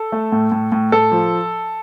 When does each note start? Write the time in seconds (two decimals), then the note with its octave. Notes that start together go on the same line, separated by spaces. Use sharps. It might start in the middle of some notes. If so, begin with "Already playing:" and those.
Already playing: A4
0.12 A3
0.32 A2
0.52 A2
0.72 A2
0.92 A2 A4
1.12 F3